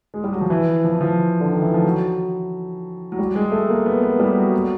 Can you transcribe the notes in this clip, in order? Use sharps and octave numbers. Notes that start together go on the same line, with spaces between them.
G#3
G3
F#3
F3
E3
F3
E3
F3
D3
D#3
E3
F3
F#3
F#3
G3
G#3
A3
A#3
B3
B3
G3
F#3
F#3